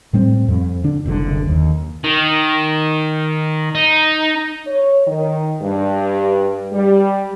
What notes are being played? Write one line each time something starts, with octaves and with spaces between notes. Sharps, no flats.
A2 G3 B3 C4
F2
D3 D4
F#1 C2 A2 D3
D#2
D#3
D#4
C#5
D#3
G2
G3